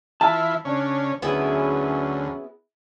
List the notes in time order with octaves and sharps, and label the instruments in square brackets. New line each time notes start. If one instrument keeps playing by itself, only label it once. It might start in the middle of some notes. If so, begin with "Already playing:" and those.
[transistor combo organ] E3 E4 F4 [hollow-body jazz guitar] A5
[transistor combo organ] C#3 C#4 [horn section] D4
[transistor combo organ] D2 [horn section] F#3 C#4 B4 [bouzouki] B3 E4 G#4